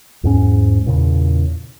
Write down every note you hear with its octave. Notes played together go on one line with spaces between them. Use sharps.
E2 G#2 C#4
E2 A#2 C#3